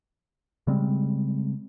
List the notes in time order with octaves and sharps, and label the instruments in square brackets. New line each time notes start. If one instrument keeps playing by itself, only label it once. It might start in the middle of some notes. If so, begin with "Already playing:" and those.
[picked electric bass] C#3 G3 G#3 C4